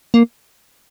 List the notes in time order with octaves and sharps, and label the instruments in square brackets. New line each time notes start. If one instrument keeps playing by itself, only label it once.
[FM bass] A#3